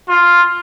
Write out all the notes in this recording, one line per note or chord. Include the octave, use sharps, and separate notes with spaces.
F4